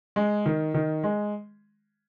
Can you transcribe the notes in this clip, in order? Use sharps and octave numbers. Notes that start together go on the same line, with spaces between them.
G#3
D#3
D#3
G#3